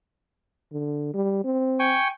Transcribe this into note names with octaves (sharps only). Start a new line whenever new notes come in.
D3
G3
C4
G5 G#5 C#6